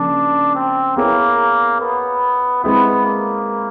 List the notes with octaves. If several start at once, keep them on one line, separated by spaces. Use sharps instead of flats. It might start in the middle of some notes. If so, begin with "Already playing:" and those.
Already playing: C#3 F3 A#3 D4
C4
A#3 B3 E4 G#4 C#5
B3
G#3 B3 C4 E4
A#3